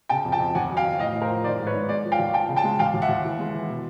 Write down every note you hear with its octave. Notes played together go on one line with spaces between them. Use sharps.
C#3 G5 A5
F2
G5 A5
F2
D#2 F#5 G#5
F#3
F5 G5
F#3
A2 D#5 F5
A2
A#4 C5
F3
D#3 C5 D5
G#2
B4 C#5
G#2
G#3 C5 D5
F3
F5 G5
D#2
F3 G5 A5
C#3
G5 A5
G#3
D#2 F5 G5
D#2
E5 F#5
D#2
E3
G#3
E3
B2